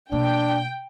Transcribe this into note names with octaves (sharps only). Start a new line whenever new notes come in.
B2 A#3 D4 G5